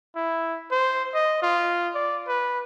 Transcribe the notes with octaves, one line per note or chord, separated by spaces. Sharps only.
E4
C5
D#5
F4
D5
B4